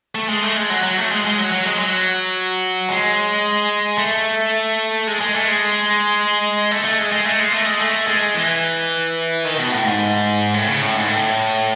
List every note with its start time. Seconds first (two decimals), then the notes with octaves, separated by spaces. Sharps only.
0.15 A3
0.29 G#3
0.43 A3
0.57 G#3
0.70 F#3
0.83 F#3
0.98 A3
1.12 G#3
1.25 G#3
1.38 F#3
1.52 F#3
1.66 G#3
1.79 F#3
2.88 G#3
3.98 A3
5.07 G#3
5.21 G#3
5.34 A3
5.48 G#3
6.71 A3
6.85 A3
6.98 G#3
7.12 G#3
7.25 A3
7.39 G#3
7.52 A3
7.66 G#3
7.80 A3
8.07 G#3
8.35 E3
9.45 D#3
9.58 B2
9.72 A2
9.84 G#2
10.54 A2
10.68 C#3
10.81 A2
10.95 G#2
11.08 A2